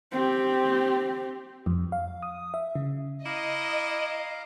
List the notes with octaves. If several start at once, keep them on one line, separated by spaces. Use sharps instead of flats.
C4 G4
F2
F5
D#6
E5
C#3
E4 D#5 F5 A#5 D6